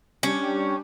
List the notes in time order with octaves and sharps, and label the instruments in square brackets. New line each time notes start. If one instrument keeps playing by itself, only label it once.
[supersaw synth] G3 D4 G4 [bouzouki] C#4